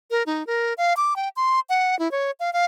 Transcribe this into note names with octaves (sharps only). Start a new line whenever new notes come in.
A#4
D#4
A#4
F5
D6
G5
C6
F#5
E4
C#5
F5
F5